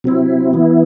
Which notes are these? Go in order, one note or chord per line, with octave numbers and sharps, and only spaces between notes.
C3 F#3 C4 E4
E3 B3 E4